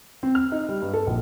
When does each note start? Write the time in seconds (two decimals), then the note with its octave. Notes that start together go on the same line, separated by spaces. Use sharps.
0.23 C4
0.35 F6
0.52 D#4
0.69 G3
0.82 G2
0.94 A4
1.07 A#1